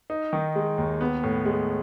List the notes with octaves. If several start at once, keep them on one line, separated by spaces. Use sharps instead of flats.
D#4
D#3
G#3
D#2
B3
A2
G#3